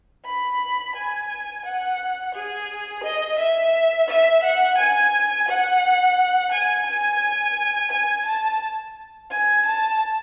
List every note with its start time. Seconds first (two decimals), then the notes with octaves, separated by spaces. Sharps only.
0.26 B5
0.96 G#5
1.65 F#5
2.35 G#4
3.04 D#5
3.39 E5
4.09 E5
4.43 F#5
4.78 G#5
5.48 F#5
6.52 G#5
6.86 G#5
7.91 G#5
8.26 A5
9.31 G#5
9.66 A5